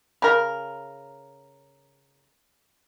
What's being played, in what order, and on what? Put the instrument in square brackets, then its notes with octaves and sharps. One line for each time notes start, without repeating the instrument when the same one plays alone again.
[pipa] C#3 A#4